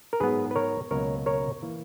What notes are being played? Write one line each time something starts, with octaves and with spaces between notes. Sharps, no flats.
A#4
G#2 F#3 B3 G#4 B4
B4
A#4 C#5
C#2 B2 F#3 A#3 A#4 C#5
A#4 C#5
E3 A#3